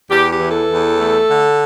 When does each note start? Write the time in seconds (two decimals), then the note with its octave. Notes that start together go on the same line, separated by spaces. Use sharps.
0.10 E2 G4
0.31 G4
0.40 E3
0.50 A4
0.71 E2
1.00 A3
1.30 D3